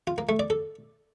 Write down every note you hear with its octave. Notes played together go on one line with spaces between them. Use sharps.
F4
A#3
A3
D5
A4